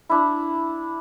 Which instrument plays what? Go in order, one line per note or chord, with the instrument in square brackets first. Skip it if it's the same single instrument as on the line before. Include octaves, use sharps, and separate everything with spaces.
[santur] D4 E4